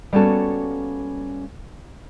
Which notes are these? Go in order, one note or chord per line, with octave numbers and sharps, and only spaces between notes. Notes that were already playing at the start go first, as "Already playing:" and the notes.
G3 A#3 B3 C#4 F#4 A4